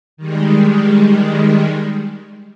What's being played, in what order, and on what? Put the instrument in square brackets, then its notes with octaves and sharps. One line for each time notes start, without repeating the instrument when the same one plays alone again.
[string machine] D#3 G3 G#3